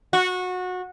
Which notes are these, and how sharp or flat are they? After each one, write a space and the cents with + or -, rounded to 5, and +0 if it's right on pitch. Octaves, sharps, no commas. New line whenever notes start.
F#4 -20